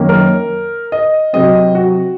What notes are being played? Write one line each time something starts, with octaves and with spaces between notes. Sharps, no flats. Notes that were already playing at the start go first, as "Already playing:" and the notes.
Already playing: F#2 D#3 A#3 C#4
A#4
D#5
C3 F#3 C4 D#5
F#4